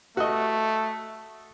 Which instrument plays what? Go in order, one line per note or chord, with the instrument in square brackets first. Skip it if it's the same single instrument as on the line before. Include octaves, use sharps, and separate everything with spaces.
[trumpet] A3 [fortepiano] F#4 D#5